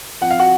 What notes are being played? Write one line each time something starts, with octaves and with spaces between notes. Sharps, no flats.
F3 C4 F#5
F5
F#4 F#5